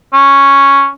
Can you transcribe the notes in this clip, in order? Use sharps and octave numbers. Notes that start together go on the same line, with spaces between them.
C#4